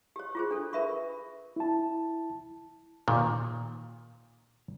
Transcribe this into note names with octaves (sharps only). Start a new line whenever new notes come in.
G4 C#5
F4 G#4 C5
D4 A4
A#4 B4 E5 B5 C#6
E4 A5
A#2 D#3